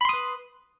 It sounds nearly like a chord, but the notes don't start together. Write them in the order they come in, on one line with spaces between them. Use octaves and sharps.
B5 C6 D#6 B4